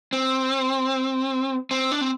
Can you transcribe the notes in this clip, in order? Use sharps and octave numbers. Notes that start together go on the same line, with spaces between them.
C4
C4
D4
C4